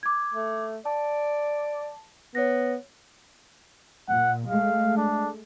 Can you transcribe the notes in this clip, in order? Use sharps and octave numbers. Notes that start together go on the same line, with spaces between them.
D6 G#6
A3
D5 A5
B3 C#5 A#6
A#2 F#5
G#3 A3 F5
D4